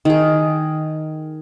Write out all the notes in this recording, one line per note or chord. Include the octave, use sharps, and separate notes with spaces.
D#3 G#4